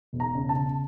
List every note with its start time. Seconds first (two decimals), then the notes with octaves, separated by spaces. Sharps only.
0.13 E1
0.20 A#5
0.35 C#3
0.49 A5
0.56 C#3